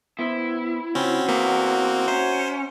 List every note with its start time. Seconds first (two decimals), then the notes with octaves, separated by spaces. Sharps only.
0.19 B3 E4 B4 C5
0.95 C#3 C4 C#4 F4 F#4 G5
1.28 E2 A#3 C4 B4
2.08 C#4 C5 E5 A#5